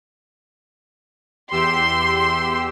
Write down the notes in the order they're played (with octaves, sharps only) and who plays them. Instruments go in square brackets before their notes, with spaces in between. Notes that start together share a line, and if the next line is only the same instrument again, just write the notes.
[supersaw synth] E2 G4 E6 [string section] C6